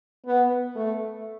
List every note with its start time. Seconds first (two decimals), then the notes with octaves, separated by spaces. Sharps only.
0.26 B3
0.76 A3